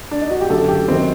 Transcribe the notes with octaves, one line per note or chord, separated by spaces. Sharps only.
D4
D#4
F#4
G4
F#2 D3 A4
G4
F#2 D#3 C4